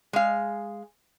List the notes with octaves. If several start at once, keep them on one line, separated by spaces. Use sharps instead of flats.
G#3 F5